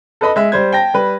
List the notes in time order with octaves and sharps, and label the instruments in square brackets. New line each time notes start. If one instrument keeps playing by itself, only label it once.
[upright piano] A4 B4 D#5 B5
G#3 E5
G3 C5 G#6
G5 A5 A#6
G3 B4